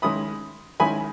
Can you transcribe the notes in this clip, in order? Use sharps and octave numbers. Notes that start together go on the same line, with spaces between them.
D#3 G#3 C#4 E4 B5 D#6
D#3 G#3 C#4 E4 G#5 B5